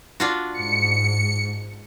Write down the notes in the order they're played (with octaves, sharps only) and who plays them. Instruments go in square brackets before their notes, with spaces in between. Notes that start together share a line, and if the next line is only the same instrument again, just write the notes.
[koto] D4 F4 F#4
[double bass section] G#2 [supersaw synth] C#7